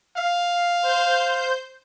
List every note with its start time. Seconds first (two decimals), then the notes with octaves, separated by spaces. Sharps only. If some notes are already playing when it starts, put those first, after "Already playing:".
0.18 F5
0.83 C5 G6